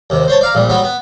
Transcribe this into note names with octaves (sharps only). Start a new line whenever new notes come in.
D#2 C3
C5 C#5 A5
D5 F5 A#5
A#1 A#2 G3
F#3 G3 B3
B3